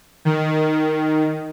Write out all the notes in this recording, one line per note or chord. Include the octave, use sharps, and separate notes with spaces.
D#3